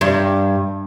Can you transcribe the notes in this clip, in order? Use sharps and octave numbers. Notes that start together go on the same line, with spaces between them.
G2